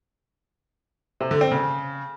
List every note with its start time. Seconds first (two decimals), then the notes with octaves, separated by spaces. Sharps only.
1.20 C3
1.31 D3
1.41 C4
1.51 C#3